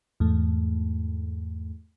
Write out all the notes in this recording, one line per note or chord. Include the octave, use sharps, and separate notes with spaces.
E2 G#2 A3